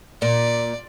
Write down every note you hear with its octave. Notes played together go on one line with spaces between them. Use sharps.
A#2 D5